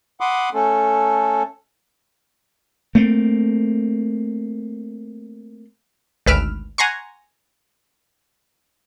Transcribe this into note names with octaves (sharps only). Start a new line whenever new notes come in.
F#5 B5 C6 D6 D#6
A3 C#4 A4
A3 A#3 C4
G#1 D2 B4 E6 F6 D7
F#5 G#5 A#5 C6 C#6